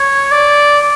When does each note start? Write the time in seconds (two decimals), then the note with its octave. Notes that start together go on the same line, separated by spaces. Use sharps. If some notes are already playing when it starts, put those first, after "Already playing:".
Already playing: C#5
0.31 D5